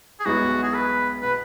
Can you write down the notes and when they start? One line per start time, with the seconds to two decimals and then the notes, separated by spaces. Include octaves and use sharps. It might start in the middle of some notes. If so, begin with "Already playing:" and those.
0.20 G#4
0.25 B1 B2 G#3 B3 E4 F#4
0.63 G#4
0.73 B4
1.22 B2 B3 B4